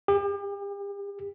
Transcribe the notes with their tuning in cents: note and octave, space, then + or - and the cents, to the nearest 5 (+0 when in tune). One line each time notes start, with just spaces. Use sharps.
G4 +40